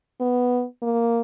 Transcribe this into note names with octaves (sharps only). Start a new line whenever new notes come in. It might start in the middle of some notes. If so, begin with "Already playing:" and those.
B3
A#3